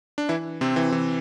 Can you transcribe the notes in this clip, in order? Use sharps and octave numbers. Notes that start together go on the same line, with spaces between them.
D4
E3 E4
C3 C4
E3
E3